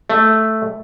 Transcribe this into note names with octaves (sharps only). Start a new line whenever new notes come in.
A3